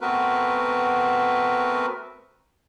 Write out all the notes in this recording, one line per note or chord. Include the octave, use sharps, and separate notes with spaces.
A3 B3 C4 F#4 A#4 B4